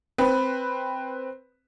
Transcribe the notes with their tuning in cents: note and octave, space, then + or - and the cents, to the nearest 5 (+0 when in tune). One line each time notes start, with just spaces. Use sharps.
C4 +0 B4 +0